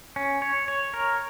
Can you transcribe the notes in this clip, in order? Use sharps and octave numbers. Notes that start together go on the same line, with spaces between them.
C#4
C#5
C#5
A#4